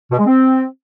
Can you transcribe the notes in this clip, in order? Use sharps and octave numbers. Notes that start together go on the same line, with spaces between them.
B2
G#3
C4